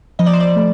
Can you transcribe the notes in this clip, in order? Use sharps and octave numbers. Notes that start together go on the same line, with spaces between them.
F3 D#5
D5
C5
D5
A3